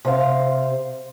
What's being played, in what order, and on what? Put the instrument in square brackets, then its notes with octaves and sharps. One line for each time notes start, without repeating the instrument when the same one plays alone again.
[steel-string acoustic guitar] C3 C5 F5